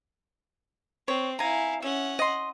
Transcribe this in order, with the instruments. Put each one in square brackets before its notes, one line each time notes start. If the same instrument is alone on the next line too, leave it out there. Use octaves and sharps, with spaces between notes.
[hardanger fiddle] C4 [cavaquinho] C#5
[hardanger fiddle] E4 F5 [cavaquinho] G#5 A#5
[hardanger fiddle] C#4 F#5 [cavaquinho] E5
[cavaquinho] D#5 C6